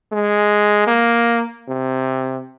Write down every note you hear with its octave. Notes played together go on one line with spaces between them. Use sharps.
G#3
A#3
C3